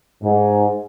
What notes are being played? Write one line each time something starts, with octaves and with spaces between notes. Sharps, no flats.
G#2